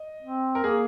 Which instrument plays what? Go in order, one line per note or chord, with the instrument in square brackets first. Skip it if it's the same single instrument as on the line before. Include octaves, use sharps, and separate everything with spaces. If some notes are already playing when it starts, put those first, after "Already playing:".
Already playing: [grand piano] D#5
[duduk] C4
[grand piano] A#4
[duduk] A#3 [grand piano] G#4